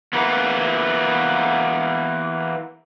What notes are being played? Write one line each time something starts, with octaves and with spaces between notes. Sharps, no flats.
E3 A#3 B3